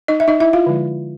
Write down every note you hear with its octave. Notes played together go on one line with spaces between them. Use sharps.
D#4 D#5
E5
D#4 D#5
E4 E5
F4 F5
D3 F3 G#3